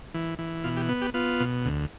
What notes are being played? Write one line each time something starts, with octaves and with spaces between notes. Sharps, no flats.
E3
E3
B2 F4
G4
B3
G4
B3 F4
B2
D2